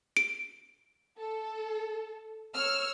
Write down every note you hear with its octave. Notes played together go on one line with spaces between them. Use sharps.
D7
A4
C#5 E6 F6